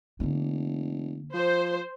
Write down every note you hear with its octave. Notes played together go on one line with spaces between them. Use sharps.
F1 D3 A#3
F3 C5